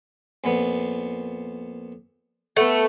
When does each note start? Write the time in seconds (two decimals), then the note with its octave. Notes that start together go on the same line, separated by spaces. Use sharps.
0.44 F2 A#2 B3
2.57 A3 B3 F#5